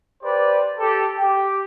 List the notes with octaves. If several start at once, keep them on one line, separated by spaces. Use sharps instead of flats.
G4 B4 C5 D5
G4 A4
G4 G5